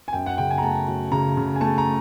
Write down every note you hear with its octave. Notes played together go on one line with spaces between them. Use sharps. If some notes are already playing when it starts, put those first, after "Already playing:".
G#5
F#2 G5
F#5
C#3 G5
G#5
A#5
A3 A5
F#3
C#3 A#5
C#3
G#5
A3 A5
A#5